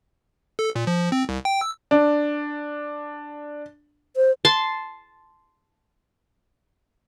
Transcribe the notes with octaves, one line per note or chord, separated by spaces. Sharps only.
A4
A#2
F3
C4
C2
G5
E6
D4
C5
A5 C6